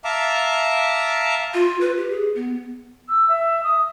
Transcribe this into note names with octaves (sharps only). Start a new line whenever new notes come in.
E5 F5 A5 A#5 D6
F4
B4
G4
G#4
B3
E6
E5
D#6